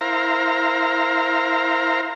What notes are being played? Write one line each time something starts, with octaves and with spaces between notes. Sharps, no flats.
E4 A#4 C5 F5 A#5